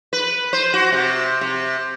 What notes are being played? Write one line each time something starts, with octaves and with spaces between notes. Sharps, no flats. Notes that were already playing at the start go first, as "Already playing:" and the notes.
B4
C5
F#4
C3
C3